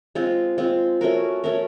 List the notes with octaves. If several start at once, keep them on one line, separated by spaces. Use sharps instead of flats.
G#3 C4 F4
G#3 C4 F4
A3 C#4 F#4 A#4
A3 C#4 F#4 A#4